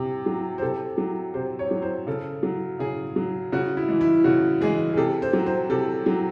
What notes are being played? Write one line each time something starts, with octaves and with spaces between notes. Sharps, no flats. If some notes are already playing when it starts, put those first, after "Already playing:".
Already playing: C3
F#3
C5
C3 A4
F#3
C3 C5
C#5
F#3
C5
C#3 A4
F#3
C#3 G#4
F#3
C#3 F#4
E4
E3 G#3
E4
C#3 F#4
E3 G#3 G#4
G#4
C3 A4
C5
F#3
C5
C3 A4
F#3